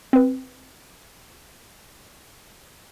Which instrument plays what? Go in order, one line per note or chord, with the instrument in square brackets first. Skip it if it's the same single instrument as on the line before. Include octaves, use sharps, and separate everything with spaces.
[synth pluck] C4 B4